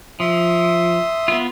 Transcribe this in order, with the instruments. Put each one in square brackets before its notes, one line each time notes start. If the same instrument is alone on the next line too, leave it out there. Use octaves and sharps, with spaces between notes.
[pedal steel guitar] F3 [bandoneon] E5 C6 D#6
[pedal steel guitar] B3 F4